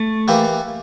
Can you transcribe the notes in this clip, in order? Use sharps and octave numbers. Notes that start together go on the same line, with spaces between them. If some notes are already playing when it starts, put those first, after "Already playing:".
Already playing: A3
E3 A#3 E4 G4